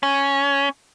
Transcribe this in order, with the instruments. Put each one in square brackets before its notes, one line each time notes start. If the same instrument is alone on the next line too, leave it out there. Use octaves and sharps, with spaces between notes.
[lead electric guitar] C#4